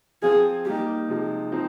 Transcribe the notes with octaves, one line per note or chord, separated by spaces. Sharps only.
F3 C4 F4 G#4
G3 A#3 D#4 G4
C3 F3 G#3 D#4
F3 C4 D#4